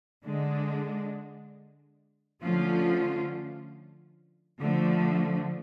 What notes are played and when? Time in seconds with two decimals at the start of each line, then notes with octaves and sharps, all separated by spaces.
0.23 D3 G#3 D4
2.42 D3 F3 A3 C#4 F4
4.61 D3 F3 A3